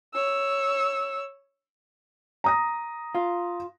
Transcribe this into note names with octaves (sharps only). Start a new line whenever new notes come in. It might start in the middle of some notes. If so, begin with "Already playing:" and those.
C#5 E6
A#5 D#6 A#6
F4